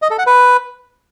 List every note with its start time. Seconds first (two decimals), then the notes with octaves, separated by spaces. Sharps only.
0.02 D#5
0.10 A4
0.18 F#5
0.27 B4